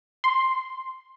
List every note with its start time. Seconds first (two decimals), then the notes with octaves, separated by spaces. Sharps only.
0.24 C6